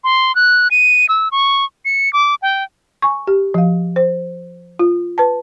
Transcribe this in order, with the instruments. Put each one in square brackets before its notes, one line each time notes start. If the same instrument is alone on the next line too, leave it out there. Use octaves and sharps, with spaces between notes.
[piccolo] C6
F#6
D#7
E6
C#6
C#7
D6
G5
[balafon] G#5 C#6
G4
F3 F5
C5
F4
B4 A5